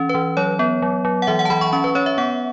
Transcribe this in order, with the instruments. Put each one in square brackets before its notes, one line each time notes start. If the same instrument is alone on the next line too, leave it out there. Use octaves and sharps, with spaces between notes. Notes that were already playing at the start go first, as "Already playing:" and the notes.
Already playing: [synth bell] E3 C#4
B4
E3
F#3 C#5
B3
F#3
F#3
F#5
E3 E5
F#5
A5
E3 B5
C#6
C#4 C#6
B4
C#4 C#5
E5
B3 F#5